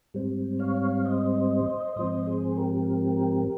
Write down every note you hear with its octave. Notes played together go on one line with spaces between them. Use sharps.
G#2 G3 C4
C#5 F5
C5 D#5
G#2 F3 C4 C5 D#5
G#4 C5
G4 A#4